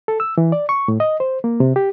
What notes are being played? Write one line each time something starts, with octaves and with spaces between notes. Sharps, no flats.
A4
E6
E3
D5
C#6
A2
D#5
C5
A#3
C3
G4